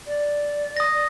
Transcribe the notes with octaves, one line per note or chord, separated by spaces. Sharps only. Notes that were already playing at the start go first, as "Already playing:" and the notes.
D5
D#6 A#6